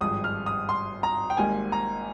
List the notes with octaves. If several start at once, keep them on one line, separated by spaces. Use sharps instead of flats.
G#1 G2 F3 G#3 D#6
F6
D#6
C6
A#5
G5
G#1 G#2 G3 A#3 G#5
A#5